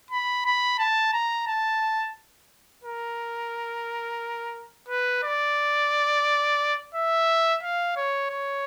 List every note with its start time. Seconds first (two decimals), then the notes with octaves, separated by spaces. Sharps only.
0.11 B5
0.45 B5
0.78 A5
1.13 A#5
1.47 A5
2.83 A#4
4.88 B4
5.23 D5
6.95 E5
7.63 F5
7.96 C#5
8.30 C#5